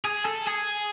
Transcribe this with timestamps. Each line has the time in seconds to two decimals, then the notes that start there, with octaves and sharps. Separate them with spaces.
0.05 G#4
0.25 A4
0.47 G#4